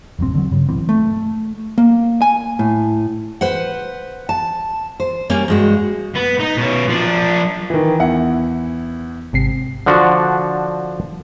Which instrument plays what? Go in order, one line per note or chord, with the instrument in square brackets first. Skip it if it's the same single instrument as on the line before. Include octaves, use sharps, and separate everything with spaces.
[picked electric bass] E1 A#1 G2 C4
D3 F#3
G2 C#3
D1 B1 E3 C4
[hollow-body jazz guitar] A3
A#3
G#5
A2
[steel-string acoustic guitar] B4 C5 F#5
A5
C5
G3 A#3 C#4
G2 G#3 F#4
[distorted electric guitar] B3
D#4
B2 C#4
F3 D4
[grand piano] D#3 E3
E2 E4 F#5
[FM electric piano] G#1 C3 C7
[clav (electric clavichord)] D3 F3 D4 F#4